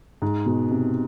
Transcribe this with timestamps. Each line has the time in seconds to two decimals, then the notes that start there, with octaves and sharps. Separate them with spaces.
0.22 G#2
0.46 B2
0.71 C3